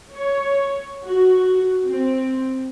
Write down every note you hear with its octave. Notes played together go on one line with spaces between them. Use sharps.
C#5
F#4
C4